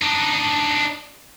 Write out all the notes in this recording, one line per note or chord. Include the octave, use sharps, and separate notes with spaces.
D4 D#4